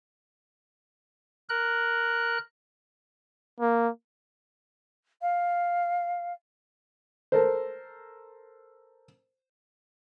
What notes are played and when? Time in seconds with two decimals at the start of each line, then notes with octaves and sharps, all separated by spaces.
1.49 A#4 F#6
3.61 A#3
5.21 F5
7.32 A4 A#4 C5